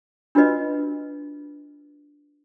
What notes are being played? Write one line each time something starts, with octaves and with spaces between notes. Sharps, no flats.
D4 F4 F#4 B4 D#5